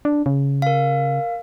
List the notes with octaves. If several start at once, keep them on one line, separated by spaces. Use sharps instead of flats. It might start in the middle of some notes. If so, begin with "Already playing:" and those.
D4
C#3
A#4 F5